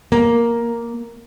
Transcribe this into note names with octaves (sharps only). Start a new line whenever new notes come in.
A#3